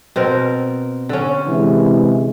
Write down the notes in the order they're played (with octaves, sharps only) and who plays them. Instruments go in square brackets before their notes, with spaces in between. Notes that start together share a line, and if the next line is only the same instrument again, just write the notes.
[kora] B2 C4 A#4
D3 C#4
[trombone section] C3 E3 G#3